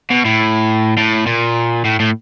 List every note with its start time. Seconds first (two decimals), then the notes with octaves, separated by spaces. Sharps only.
0.11 B2
0.25 A2
0.98 A2
1.27 A#2
1.85 A2
2.00 A2